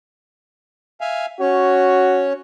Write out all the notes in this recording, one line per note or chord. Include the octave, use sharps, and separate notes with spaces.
E5 F5 G#5
C#4 F#4 C#5